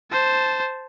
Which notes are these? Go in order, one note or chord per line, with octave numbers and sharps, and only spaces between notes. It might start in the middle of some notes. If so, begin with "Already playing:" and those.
C5 A5